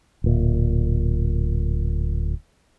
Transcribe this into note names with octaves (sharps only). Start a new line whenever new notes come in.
D1 A#2